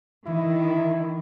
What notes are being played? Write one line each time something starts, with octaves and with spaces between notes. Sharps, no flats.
D#3 E3 E4